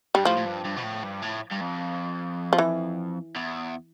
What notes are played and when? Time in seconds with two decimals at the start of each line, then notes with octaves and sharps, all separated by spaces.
0.15 G2 G3
0.25 A2 F3
0.38 A2
0.46 G2
0.65 G2
0.77 B2
0.83 A2
1.04 G2
1.22 A2
1.52 G2
1.61 F2
2.53 F3
2.58 E3
3.36 E2